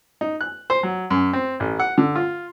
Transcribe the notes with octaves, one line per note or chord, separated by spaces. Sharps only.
D#4
F#6
C5
F#3
F#2
C4
A1
F#5
D3
F4